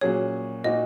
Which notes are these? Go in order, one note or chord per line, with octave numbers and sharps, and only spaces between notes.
A#2 F#3 C#4 G#4 C#5
A#2 A#3 D#4 F#4 D#5